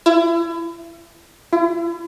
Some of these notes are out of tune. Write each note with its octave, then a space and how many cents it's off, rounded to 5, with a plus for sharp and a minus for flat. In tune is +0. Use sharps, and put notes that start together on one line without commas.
E4 +35
E4 +45